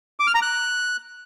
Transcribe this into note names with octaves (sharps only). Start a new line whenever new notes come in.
D6
F6
A#5
F#6